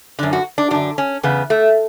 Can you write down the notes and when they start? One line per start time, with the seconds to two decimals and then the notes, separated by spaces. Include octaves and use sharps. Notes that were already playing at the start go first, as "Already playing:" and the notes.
0.19 F#2 D3 D4
0.33 F#4
0.58 D4
0.71 F#2 D3 D4
0.98 C#4
1.23 E2 C#3 B3
1.50 A3